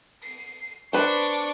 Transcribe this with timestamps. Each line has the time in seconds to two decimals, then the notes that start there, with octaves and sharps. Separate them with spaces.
0.24 C7
0.93 D4 B4 C5 C#6